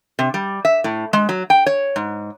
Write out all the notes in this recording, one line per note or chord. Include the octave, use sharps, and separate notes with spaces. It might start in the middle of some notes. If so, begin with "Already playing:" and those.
C3
G3
E5
A2
G#3
F#3
G5
C#5
G#2